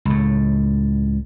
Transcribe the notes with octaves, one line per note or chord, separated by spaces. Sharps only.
C#2 A2